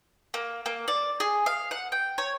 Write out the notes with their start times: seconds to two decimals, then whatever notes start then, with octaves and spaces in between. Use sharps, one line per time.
0.34 A#3
0.66 A#3
0.88 D5
1.20 G#4
1.46 F5
1.71 F#5
1.92 G5
2.18 C#5